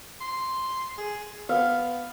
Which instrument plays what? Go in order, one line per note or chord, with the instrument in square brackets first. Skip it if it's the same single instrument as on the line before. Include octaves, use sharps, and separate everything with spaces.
[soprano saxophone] C6
G#4
[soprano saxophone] B3 [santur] F5